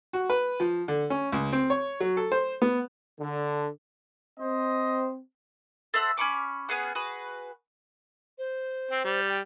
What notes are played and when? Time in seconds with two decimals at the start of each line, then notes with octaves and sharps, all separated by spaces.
0.13 F#4
0.30 B4
0.60 F3
0.88 D3
1.10 C#4
1.32 C#2
1.52 C4
1.70 C#5
2.00 F#3
2.17 A4
2.32 C5
2.62 B3
3.20 D3
4.40 C4 C5 D#5
5.94 A4 C5 E5 F#5
6.17 C#4 B5 C#6 D6
6.69 B3 C#4 G#4 F#5
6.95 F#4 G#4 B4
8.38 C5
8.91 C4
9.04 G3
9.28 G5